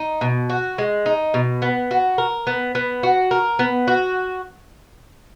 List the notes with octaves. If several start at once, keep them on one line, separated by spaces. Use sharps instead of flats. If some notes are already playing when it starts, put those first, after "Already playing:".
Already playing: D#4
B2
F#4
G#3
D#4
B2
B3
F#4
A#4
B3
B3
F#4
A#4
B3
F#4